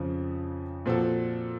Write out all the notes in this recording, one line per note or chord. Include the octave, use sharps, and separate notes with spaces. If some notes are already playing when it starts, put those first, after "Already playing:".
Already playing: F2 C#3 F3
A#2 F3 C4 F#4 A4